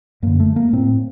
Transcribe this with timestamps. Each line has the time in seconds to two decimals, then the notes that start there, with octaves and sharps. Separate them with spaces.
0.23 F#2 D3 A#3
0.40 A3
0.56 A#3
0.73 A2 C4